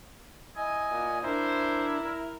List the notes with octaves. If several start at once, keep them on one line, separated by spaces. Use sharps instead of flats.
E4 D#5 G#5
A#2
D4 E4 A#4 C5
A#4